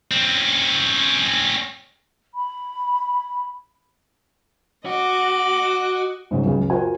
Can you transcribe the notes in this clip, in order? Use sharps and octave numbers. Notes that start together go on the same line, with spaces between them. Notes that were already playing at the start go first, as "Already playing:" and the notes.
C4 C#4
B5
F#4 D#5 D6
G#2 C#3 F#3
C#2 F#2 C#3
F4 F#4 A#4 C5 G#5